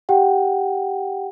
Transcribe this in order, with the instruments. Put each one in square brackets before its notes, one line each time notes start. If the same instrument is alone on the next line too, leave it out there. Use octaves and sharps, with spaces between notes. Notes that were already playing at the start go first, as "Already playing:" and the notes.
[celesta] G4 F#5 G5